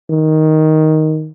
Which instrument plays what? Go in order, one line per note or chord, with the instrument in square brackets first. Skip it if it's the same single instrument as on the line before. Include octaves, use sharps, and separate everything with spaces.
[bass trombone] D#3